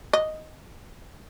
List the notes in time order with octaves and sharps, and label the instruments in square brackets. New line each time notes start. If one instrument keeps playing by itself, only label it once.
[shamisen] D#5